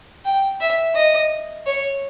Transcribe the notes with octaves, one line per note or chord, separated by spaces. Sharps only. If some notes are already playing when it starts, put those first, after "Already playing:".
G5
E5
D#5
C#5